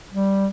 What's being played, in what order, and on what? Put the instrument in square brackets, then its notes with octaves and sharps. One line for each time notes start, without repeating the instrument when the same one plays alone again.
[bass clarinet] G3